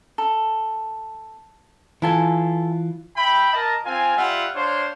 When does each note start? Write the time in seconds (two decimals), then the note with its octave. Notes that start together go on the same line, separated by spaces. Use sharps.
0.18 A4
2.02 E3 E4 F4 A4 G#5
3.16 E5 G5 B5
3.53 A#4 D#5 A5
3.86 C4 F4 G#5
4.16 G3 F4 E5 F#5
4.55 D4 C5 C#5 F5 C6